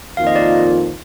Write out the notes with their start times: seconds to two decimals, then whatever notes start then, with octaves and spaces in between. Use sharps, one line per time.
0.17 F2 D#3 A#3 F4 F5
0.27 D#5
0.36 D5